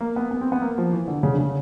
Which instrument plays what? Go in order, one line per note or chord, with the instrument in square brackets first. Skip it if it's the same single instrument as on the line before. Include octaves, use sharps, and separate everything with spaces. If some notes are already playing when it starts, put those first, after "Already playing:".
[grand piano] A#3
B3
B3
C4
B3
A#3
F3
E3
D3
C#3
D3
C#3